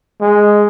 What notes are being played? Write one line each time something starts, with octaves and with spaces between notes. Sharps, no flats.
G#3